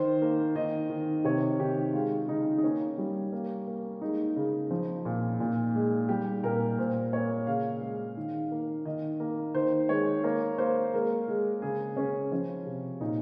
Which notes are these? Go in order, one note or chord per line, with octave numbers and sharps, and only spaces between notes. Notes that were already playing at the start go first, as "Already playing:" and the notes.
Already playing: D#3 C5
A#3
D#3 D#5
D#3
C3 C#5
D#3 G4
G#3 F4
C#3 D#4
D#4
A#3 C#4
G3
A#3
A#3
G#3 D#4
C#3
F3
A#2
A#2
G#3
G3 G4
A#2 A#4
A#2 C5
A#3 C#5
C#3 F5
G#3
D#3
A#3
D#3 D#5
A#3
D#3 C5
G#3 C#5
A#3 C#5
A#3 C5
G#3 A#4
G#3
C#3 G#4
C#3 C#4
F3 C#4
C3
A#2 D#4